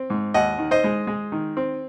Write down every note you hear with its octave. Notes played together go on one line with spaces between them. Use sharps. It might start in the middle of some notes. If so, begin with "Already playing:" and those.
Already playing: C4
G#2
D#2 D#5 F#5
D#3
C5 D#5
G#3
G#3
D#3
C4